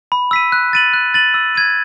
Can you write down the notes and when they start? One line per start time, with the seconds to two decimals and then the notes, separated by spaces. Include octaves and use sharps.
0.12 B5
0.31 E6 B6 D#7
0.52 F#6
0.73 A6 D#7 F#7
0.94 F#6
1.14 A6 D#7 F#7
1.34 E6
1.55 G#6 D#7